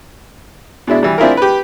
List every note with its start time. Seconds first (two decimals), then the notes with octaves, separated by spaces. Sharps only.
0.87 B2 G#3 D4 E4
1.03 E3 G3
1.18 C4 D4 E4 F4 G#4 A#4
1.37 G4 B4